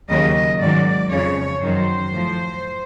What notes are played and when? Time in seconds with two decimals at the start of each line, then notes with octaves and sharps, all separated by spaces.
0.09 D#2 C#3 F#3 D#5
0.60 G#2 D#3 F#3 D5
1.11 F2 C#3 F3 C#5
1.61 F#2 D#3 F#3 C5
2.13 A2 F3